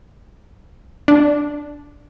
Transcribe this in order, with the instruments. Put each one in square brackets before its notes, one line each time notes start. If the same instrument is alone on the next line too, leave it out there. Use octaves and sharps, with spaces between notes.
[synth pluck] D4